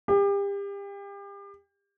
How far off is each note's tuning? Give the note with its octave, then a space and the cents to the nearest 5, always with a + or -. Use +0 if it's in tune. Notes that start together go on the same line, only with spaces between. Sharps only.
G4 +35